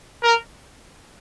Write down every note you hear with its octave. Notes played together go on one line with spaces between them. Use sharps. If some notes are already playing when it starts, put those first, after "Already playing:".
A#4